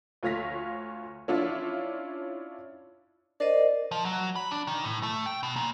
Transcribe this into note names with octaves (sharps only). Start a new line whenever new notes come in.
D2 F4 C#5 F5 A#6 B6
C#4 D4 E4 F4
A#4 C5 D5 D#5
F3
F#3
B5
D4
D#3
A2
A3
G5
B2
A#2